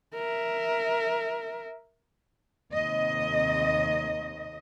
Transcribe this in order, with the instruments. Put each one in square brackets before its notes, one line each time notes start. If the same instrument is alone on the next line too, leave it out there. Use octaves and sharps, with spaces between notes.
[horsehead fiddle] A#4 E5
[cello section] D#2 C3 D#5